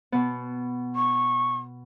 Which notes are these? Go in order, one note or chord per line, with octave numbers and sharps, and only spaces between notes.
B2 B3
C#6